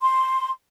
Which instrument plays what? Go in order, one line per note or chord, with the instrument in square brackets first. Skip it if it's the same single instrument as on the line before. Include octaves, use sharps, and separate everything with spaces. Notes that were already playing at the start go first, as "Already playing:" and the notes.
[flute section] C6